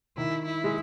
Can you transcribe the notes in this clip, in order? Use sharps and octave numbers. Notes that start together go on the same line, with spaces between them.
D#3 E4
E4
G#3